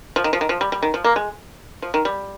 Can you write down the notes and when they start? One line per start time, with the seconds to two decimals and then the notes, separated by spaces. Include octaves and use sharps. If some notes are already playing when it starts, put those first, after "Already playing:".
0.16 F3
0.24 D#3
0.33 F3
0.41 D#3
0.49 F3
0.61 G3
0.72 G3
0.83 D#3
0.94 F3
1.04 A#3
1.16 G#3
1.82 F3
1.94 D#3
2.05 G3